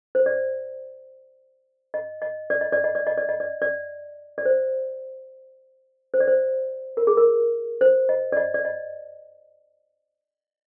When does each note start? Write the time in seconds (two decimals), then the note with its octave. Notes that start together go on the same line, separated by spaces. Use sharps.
0.15 C5
0.26 D5
1.94 D#5
2.22 D#5
2.50 D5
2.61 D#5
2.72 D5
2.84 D#5
2.95 D5
3.07 D#5
3.17 D5
3.29 D#5
3.40 D5
3.62 D5
4.38 D5
4.45 C5
6.14 C5
6.20 D5
6.28 C5
6.97 A#4
7.07 G#4
7.17 A#4
7.81 C5
8.09 D#5
8.32 D5
8.37 D#5
8.54 D5
8.65 D#5